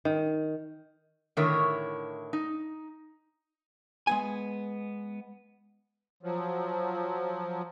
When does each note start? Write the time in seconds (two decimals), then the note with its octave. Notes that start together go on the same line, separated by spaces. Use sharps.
0.05 D#3
1.37 A2 D3 D#3 E4 A#4 C#5
2.33 D#4
4.07 G#3 B3 G#5
6.23 F3 F#3